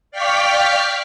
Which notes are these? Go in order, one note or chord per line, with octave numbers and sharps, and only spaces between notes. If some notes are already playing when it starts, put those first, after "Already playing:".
D5 F5 G5 C#6 F6 B6